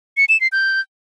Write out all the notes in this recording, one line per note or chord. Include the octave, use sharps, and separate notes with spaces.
C#7
E7
C7
G6